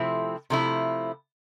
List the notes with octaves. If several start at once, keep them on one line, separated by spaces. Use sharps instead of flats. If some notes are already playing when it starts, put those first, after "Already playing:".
Already playing: C3 F3 A3 C4 E4
C3 F3 A3 E4